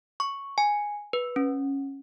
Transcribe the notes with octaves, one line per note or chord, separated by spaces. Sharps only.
C#6
G#5
B4
C#4